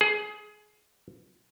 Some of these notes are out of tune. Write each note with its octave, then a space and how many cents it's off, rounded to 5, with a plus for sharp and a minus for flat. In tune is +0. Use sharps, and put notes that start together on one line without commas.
G#4 +20